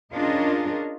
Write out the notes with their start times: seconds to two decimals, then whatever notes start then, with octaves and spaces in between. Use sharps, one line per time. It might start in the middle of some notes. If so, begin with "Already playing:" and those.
0.14 C#4 D4 F4 G#4 A#4 D#5